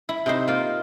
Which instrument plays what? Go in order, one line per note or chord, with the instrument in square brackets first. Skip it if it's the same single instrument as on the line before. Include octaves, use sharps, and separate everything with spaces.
[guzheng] E4
C3 D#4 C5
A#3 F4